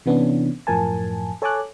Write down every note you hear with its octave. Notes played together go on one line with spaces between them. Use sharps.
C3 E3 B3 C#4 D4
F#2 A2 F3 A#4 G#5 A5
A4 C#5 G#5 A5 D6 F#6